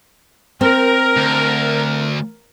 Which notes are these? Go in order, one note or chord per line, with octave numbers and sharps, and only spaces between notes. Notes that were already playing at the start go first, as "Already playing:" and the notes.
C4 A#4
D2